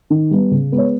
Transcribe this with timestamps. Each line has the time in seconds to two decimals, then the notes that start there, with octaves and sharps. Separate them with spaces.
0.10 D#3
0.31 G3 B3
0.51 C#3
0.72 G#3 B3
0.78 C#5